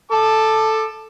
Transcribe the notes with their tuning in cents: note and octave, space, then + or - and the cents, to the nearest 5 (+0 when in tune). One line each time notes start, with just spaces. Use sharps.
A4 +0 A5 +0 D6 +25